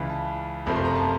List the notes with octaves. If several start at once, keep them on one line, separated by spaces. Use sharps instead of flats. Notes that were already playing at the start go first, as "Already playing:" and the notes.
Already playing: C#2 C#3 E3 B5
A5
F#1 F2 C3 F3 A3 B5
C6
A#5
A5